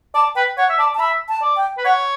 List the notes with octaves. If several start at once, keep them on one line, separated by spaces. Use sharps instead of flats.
D5 A5
B4 G5
C#5 F#5
E5
D5 A5
A5
E5 B5
A5
D5
G5
B4
C#5 F#5